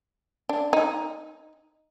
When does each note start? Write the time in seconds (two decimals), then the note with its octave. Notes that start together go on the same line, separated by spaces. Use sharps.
0.49 D4
0.73 D#4